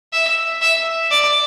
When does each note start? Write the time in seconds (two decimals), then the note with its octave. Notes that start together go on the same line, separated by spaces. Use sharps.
0.13 E5
0.61 E5
1.11 D5